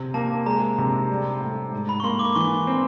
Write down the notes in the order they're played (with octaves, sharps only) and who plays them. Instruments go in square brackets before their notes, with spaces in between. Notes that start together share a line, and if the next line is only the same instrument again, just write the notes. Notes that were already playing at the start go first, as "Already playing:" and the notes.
Already playing: [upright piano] C3
[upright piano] A#3 [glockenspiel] A5
[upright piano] G#3 [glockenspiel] A#5
[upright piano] C3
G3
A2
G#2
[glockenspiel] B5
C#6
[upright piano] A#3 [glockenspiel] C6
[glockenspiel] D6
[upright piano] E3 [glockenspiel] C#6
[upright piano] C4